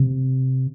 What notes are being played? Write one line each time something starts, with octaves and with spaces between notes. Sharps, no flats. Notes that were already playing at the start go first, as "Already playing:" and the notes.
Already playing: C3